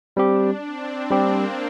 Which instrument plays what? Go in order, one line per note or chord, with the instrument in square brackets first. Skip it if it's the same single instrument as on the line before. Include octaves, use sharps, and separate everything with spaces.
[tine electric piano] G3 C4 G4 [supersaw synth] D4
[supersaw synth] C4
[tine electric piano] G3 C4 G4 [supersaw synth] A#3